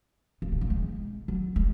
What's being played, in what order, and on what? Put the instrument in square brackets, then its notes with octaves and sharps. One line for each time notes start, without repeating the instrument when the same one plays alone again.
[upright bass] C#3
B2
C#3
G#3
F#3
G#3